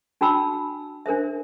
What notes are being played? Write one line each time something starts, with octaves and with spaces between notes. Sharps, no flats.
D4 F#4 G5 A5 B5 E6
D4 A#4 C5 E5